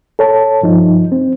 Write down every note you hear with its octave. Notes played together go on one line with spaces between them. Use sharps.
A4 C#5 A5
G2 F3 D#4
C4